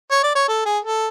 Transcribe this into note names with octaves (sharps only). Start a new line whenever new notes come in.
C#5
D5
C#5
A4
G#4
A4